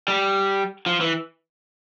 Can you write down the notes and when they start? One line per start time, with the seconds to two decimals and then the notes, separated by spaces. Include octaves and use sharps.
0.08 G3
0.86 F3
1.01 E3